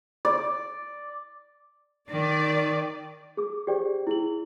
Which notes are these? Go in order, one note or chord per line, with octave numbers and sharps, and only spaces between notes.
D5
D#3 D5
G#4 D6
G4 G#4 C5 D5 G5
E4 G#4 F#7